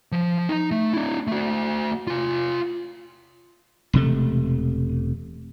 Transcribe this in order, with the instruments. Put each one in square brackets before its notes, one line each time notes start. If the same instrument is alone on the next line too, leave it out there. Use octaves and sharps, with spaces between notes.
[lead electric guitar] F3
D#4 A#5
A3
D4 E4
A3 F#4
F4 G#5
[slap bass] E1 C3 A3